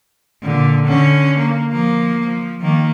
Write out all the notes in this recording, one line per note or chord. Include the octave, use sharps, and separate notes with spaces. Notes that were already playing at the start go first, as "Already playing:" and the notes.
A#2 D3
D3 C#4
A#3
F3 A#3
F3
D#3 A#3